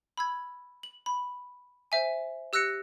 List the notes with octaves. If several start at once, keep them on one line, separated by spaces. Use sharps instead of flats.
B5 E6 G#6
F#7
B5
C5 E5 G#5
G4 E6 F#6 A#6 C#7